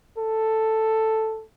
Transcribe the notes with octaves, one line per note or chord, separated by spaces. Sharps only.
A4